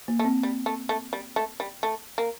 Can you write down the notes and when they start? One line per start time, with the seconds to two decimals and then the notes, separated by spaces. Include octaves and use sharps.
0.08 A#3
0.19 A3
0.25 C4
0.43 G3
0.66 A3
0.89 A3
1.13 G3
1.36 A3
1.60 G3
1.83 A3
2.18 A#3